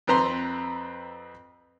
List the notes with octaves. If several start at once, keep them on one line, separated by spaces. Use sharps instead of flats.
F2 C4 B4 A#5 C6